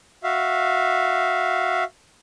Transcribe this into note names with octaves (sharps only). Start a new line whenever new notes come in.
F#4 E5 F5